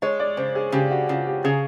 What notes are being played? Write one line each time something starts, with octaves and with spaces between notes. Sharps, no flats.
G#3 C#5
D5
C#3 C5
G#4
C#3 G4
F#4
C#3 F4
G4
C#3 G#4